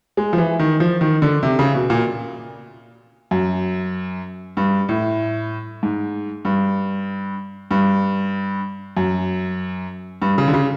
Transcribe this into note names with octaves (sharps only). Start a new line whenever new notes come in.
G#3
F3
E3
D#3
F3
D#3
D3
C3
C#3
B2
A#2
F#2
G2
A2
G#2
G2
G2
F#2
G2
C#3
D3
C#3